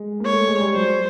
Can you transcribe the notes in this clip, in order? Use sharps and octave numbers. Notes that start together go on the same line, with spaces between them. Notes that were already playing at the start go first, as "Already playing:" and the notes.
Already playing: G#3
A#3
C#5
A3
G#3
G3
F#3 C5